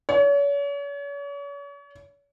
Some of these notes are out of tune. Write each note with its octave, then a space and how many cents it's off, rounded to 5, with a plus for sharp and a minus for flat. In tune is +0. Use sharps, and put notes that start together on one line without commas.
C#5 +40